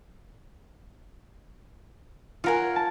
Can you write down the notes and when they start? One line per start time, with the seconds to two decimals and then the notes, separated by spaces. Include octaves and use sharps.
2.44 F4 A#4 C#5 F#5 G#5
2.76 A5